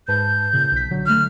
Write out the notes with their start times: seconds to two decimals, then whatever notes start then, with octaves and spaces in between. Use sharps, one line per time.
0.08 G#2 B4 A5 G6
0.53 A#2 C#3
0.72 B1 B6
0.90 D3 F#3
1.06 D3 A3 F6